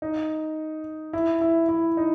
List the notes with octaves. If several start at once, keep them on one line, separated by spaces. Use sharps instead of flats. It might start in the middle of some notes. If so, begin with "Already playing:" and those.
D#4
E4
E4
E4
D#4